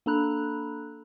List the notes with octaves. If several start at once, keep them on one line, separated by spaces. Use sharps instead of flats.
A#3 D4 A4 A#5 B5 F#6